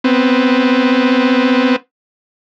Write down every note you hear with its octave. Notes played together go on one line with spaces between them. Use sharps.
B3 C4